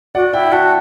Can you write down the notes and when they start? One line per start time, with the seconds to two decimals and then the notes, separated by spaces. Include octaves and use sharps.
0.15 F#4 D5 F#5
0.33 E4 E5 G5
0.52 F#4 F#5 A5